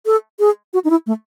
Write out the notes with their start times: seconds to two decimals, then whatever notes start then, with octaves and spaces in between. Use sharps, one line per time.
0.06 A4
0.39 G#4
0.73 F#4
0.84 D#4
0.90 E4
1.06 A3